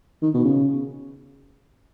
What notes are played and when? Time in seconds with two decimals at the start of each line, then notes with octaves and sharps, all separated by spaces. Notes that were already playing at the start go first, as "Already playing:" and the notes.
0.22 D#3
0.34 B2
0.45 C#3